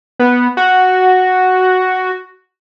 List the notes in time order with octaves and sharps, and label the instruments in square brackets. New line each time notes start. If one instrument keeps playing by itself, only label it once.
[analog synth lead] B3
F#4